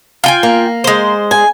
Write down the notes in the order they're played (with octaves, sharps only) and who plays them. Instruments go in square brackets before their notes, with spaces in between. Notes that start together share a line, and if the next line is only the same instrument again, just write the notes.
[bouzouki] F4 G5 G#5
[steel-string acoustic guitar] A#3
[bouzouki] G#3 C5
[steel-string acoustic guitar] G#5